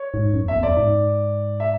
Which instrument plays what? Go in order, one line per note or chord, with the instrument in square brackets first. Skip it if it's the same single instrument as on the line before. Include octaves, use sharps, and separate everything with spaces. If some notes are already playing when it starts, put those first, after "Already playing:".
Already playing: [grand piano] C#5
[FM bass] G#2
F#2
E2
[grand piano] E5
[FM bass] E2
[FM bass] F#2 [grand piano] D5
[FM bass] G#2
[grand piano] E5